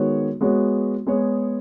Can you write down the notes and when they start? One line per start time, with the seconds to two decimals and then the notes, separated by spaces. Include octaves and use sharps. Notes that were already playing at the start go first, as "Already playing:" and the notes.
Already playing: D#3 G#3 B3 F#4 C#5
0.41 G#3 B3 F#4 C#5
1.07 G#3 B3 G#4 C#5